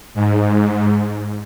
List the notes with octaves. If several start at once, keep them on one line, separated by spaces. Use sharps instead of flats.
G#2